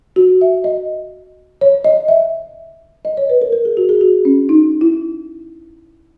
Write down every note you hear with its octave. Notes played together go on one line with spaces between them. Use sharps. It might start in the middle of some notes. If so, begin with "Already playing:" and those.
F#4
E5
D#5
C#5
D#5
E5
D#5
C#5
B4
A#4
A#4
G#4
F#4
G#4
F#4
C#4
D#4
E4